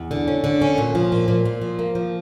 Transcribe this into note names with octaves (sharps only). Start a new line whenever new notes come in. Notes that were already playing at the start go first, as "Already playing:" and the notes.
Already playing: E2
D3
C#4
D3
C#4
A#2
F3
A#2
A#2
A#2
F3
A#3
F3